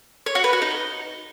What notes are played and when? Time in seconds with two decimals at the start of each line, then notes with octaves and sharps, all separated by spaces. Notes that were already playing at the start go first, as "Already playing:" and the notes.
0.26 C#5
0.35 F#4
0.44 B4
0.53 F#4
0.62 D#4